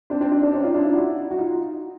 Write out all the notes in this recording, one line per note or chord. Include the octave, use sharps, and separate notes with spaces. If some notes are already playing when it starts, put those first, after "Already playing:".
C4 D4
C4 D4
C4 D4
C4 D4
C#4 D#4
D#4 F4
D4 E4
D#4 F4
E4 F#4
F#4
D#4 F4